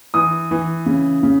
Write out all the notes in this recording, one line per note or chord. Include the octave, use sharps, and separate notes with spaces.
E3 D#6
E3
C#3
C#3